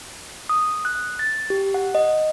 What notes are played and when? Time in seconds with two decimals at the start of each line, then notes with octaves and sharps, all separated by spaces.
0.49 D#6
0.85 F#6
1.19 A6
1.50 G4
1.74 F#5
1.95 D#5